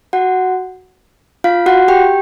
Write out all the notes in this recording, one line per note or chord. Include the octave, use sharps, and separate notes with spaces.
F#4 F#5
F4 F5
F#4 F#5
G4 G5